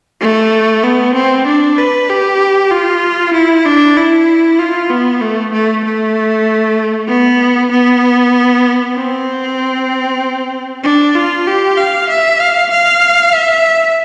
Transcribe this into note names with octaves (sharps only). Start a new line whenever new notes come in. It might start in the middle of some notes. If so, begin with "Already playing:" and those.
A3
B3
C4
D4
B4
G4
F4
E4
D4
E4
F4
B3
A3
A3
A3
B3
B3
C4
D4
F4
G4
F5
E5
F5
F5
E5